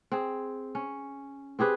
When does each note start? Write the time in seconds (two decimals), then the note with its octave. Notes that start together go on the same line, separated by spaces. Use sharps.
0.12 C4 G#4
0.75 C#4
1.59 C4 G4 G#4 B4